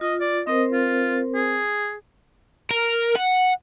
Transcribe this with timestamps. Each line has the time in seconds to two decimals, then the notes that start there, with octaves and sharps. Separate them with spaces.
0.01 F4 D#5
0.20 D5
0.47 C4 A#4 C5 D#5
0.72 F4
1.34 G#4
2.71 A#4
3.15 F#5